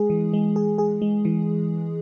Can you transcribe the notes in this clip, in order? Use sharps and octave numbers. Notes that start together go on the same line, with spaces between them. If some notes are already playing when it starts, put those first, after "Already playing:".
Already playing: G#3 G#4
E3
G#3
G#4
G#4
G#3
E3